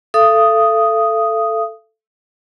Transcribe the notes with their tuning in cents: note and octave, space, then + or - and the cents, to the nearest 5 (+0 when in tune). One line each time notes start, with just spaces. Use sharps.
A4 +0 F5 -45 D#6 +0